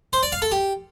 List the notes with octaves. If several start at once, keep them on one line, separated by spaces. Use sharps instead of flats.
C5
D5
F5
A4
G4